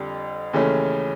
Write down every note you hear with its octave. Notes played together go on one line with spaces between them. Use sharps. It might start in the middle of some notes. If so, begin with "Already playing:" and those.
Already playing: F2 D3 G3
D#2 C#3 E3 A3 C#4